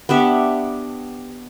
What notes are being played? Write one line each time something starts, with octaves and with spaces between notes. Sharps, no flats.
B3 D4 G4 E5